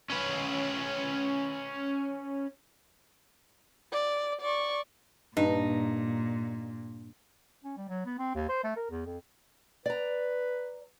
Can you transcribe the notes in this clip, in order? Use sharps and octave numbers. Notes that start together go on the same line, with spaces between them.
C#4 B4
D5
D5 C#6
G2 A#2 D#4
C#4
G3
F#3
B3
C4
D#2
C5
A3
A#4
E2
F2
B4 D5 A#5